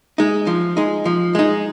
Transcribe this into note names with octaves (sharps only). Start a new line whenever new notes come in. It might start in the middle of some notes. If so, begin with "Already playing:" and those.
G#3 D#4
F3
G#3 D#4
F3
G#3 D#4